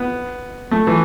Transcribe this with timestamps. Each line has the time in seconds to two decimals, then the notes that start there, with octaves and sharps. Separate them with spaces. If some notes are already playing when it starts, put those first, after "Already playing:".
Already playing: B3
0.71 A3
0.87 E3